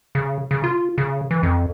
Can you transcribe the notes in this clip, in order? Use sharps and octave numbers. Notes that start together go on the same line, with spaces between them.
C#3
C#3
F4
C#3
E3
F2